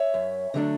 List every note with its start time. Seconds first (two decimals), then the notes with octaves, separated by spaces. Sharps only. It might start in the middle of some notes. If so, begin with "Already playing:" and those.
Already playing: C#5 E5
0.14 F#2
0.54 D3 F#3 A3 D4